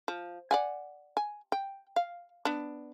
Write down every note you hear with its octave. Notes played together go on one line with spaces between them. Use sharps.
F3
D5 F#5 G#5
G#5
G5
F5
B3 D4